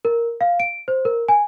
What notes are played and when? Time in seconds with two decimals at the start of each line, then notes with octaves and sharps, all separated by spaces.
0.05 A#4
0.41 F5
0.60 D7
0.88 C5
1.05 A#4
1.28 G#5